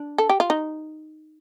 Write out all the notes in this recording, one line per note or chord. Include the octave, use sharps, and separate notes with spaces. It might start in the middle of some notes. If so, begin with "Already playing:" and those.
Already playing: D4
A4
G4
F4
D#4